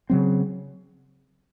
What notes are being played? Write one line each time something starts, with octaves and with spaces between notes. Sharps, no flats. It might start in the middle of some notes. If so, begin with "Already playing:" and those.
C#3 F#3 C4